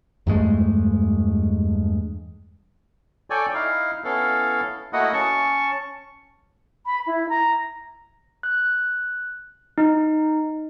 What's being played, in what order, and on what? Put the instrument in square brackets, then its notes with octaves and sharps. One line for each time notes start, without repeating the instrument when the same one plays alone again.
[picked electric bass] E2 G2 G#3 A3
[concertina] A4 C#5 D5 G5 G#5
D#4 E4 F5
B3 C#4 E4 A4 F5
A3 A#3 E4 F#4 D#5 F#5
C#4 A5 C#6
[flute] B5
E4
A#5
[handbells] F#6
D#4